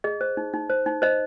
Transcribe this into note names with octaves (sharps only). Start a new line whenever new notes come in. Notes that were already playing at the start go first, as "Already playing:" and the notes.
G#4 D#5
C5
D#4
D#4
C5
D#4
C5 D#5